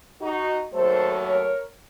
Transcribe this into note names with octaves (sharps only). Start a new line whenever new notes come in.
D#4 F#4
D#2 D#3 F#3 A3 A4 C5
A#4 C#5